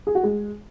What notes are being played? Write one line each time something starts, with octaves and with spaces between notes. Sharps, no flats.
G#4
F#4
G#3